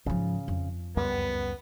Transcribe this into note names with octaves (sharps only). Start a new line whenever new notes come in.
G#2 C#3 F3
F2
C#2 F#2 G3 B3